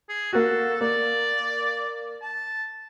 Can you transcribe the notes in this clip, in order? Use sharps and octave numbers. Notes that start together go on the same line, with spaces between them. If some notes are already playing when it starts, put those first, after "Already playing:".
G#4
A#3 F#4 A4
A#3 D5
A5